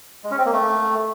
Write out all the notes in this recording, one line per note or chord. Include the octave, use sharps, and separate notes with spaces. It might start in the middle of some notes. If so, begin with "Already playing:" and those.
G#3
C#4
C4
A#3
A3